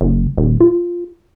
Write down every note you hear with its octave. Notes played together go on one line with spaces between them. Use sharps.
F#1
D#1
F4